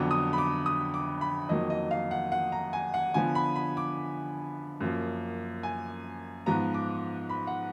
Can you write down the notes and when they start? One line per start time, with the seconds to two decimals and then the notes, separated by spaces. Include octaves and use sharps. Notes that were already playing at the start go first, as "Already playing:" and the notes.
Already playing: F2 D3 F#3 B3 D6
0.11 D#6
0.33 B5
0.38 D6
0.66 D#6
0.94 D6
1.21 B5
1.49 F2 D#3 F#3 A#3 D#5
1.70 D#5
1.91 F5
2.11 F#5
2.32 F#5
2.52 A#5
2.73 G#5
2.94 F#5
3.14 D3 F3 B3 G#5
3.35 B5
3.56 B5
3.77 D6
4.81 F#2 F3 A#3
5.63 G#5
6.46 G#2 F3 B3 A#5
6.74 D6
7.29 B5
7.47 F#5